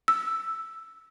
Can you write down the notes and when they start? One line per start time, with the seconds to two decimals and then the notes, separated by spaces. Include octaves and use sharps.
0.08 E6